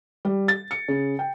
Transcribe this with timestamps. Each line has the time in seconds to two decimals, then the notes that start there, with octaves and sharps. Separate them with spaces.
0.25 G3
0.48 A6
0.71 C#7
0.88 C#3
1.19 G5